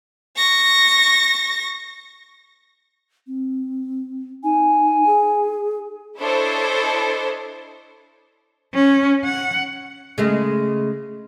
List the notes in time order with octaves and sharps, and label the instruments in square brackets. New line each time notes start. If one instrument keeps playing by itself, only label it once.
[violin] C#6 A#6
[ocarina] C4
[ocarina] D#4 [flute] G#5
[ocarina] G#4
[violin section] D4 E4 A4 C5 C#5 D#5
[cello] C#4
F#5
[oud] C#3 G#3 A3